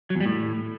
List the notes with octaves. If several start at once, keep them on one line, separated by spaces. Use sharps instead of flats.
F#3
E2
G3
A2